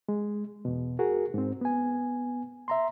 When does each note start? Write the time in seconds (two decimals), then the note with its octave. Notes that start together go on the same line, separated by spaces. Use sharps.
0.09 G#3
0.65 E2 B2
0.99 F#4 G#4 A#4
1.34 G#2 C4
1.61 B3 G#5
2.68 E5 A#5 C6